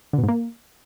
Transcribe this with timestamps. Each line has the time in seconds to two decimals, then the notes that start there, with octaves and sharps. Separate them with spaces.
0.13 D3
0.18 B2
0.23 G#2
0.28 A#3